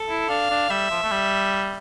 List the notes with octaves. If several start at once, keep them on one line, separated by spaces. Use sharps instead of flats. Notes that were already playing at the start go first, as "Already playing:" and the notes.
Already playing: A4
E4
D4 F5
D4
G3 E5
F3
A3
G3